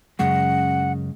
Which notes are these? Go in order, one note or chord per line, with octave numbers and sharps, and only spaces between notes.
F#2 C#3 G#3 F#5